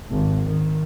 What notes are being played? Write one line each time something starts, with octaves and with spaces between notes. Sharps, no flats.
G#1
D#3